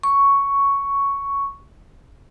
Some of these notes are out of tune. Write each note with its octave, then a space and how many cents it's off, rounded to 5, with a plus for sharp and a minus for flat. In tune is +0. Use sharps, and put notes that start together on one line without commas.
C#6 +5